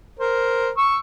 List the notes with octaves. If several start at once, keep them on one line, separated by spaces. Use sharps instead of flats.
A#4 C5
C#6 E6